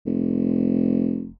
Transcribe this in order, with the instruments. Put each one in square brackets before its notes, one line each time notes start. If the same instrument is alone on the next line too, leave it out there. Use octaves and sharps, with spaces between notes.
[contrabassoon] F1